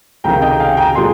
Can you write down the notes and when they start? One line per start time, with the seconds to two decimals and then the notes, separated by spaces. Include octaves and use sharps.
0.24 C#2 C3 D#3 G5 A#5
0.42 D#5 G5
0.60 F5 G#5
0.77 G5 A#5
0.95 A#2 G#3 G#5 C6